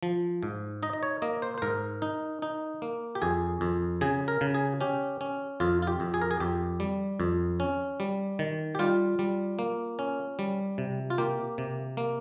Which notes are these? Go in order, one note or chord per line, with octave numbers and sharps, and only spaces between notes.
F3
G#2
D#4 D#5
D#5
C#5
A#3 D#5
C5
C5
G#2 A#4
D#4
D#4
A#3
G4
F2 G#4
F2
C#3 G#4
A#4
C#3
G#4
C#4 G4
C#4
F2 F4
F4
G4
F2
G#4
A#4
G#4
F2 G4
G3
F2
C#4
G3
D#3
G4
G3 F4
G3
A#3
C#4
G3
C3
F4
A#3 G4
C3
A#3